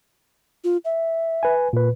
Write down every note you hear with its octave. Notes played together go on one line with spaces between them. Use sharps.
F4
E5
B4 G#5
A#2 B4